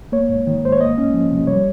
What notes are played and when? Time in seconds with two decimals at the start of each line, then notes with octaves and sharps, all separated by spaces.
0.12 A#3 C#5
0.29 G#2
0.47 D#3
0.63 G#2 C5
0.72 C#5
0.80 A#3 D#5
0.98 C#4
1.14 F3
1.31 C3
1.47 G3 C#5